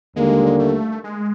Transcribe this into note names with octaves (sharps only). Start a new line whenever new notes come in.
D#2 D3 G3 G#3 A#3
A3
G#3